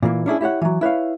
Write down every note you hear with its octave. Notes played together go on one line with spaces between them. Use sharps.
A#2 E3 A#3
C#4 D4 E4 G#4
E4 G4 C#5 F#5
E3 F#3
E4 B4 C#5 F5